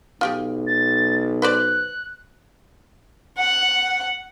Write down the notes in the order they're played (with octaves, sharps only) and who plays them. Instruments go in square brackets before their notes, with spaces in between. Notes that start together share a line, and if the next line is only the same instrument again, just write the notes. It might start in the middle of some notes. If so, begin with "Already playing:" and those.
[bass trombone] B1 [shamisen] F4 G4 G#4
[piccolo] A6
[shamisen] B4 C5 D5 [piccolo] F#6
[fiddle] F#5